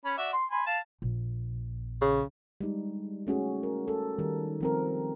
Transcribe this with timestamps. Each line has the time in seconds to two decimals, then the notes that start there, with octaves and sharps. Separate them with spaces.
0.05 C#4 B5
0.18 F#4 D5 E5
0.33 C6
0.51 G#5 B5 C6
0.66 F5 A5
1.02 A#1
2.01 C#3
2.61 G3 G#3 D#4
3.27 A3 C#4 F#4 G#4
3.63 A#4
3.88 A4
4.19 D#3 G3 A#4
4.61 F3 C4 A#4